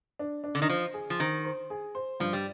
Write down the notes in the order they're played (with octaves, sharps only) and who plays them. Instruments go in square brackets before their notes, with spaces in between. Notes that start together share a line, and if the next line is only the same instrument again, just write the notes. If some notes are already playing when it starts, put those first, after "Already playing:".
[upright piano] D4
D4
[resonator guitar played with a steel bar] D3
D#3
[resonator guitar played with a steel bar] F3 [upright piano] C5
[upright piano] G#4
[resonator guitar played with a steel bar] F3
[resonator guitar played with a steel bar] D#3 [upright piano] C5
[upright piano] C5
G#4
C5
[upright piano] G2 [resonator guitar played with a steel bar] F3
[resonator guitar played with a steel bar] G3